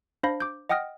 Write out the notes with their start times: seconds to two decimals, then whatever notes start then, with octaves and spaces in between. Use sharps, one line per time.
0.23 D4 C5 F5 B5 A#6
0.40 D6 G6
0.69 D#5 F#5 G5 D#6 F6 A#6